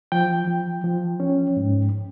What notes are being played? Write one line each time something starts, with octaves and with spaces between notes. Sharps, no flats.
F3 G5
F3
F3
C#4
G#2